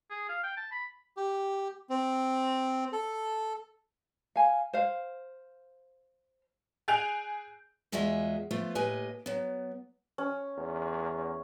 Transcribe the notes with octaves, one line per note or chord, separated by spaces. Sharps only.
G#4
F5
G5
A5
B5
G4
C4
A4
F5 G#5
C5 F5
G#4 G#5 F#6 G6 D7 F7
E2 G#3 F4 F#4 G#4 E5
F3 A3 B3 F4
A2 A#3 G4 B4 D#5 G#5
F#3 B3
C#4
E2